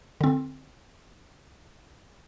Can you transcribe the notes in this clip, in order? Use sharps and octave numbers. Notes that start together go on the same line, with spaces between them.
D3 C4